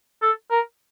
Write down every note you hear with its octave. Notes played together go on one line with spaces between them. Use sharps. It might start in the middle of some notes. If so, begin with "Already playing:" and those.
A4
A#4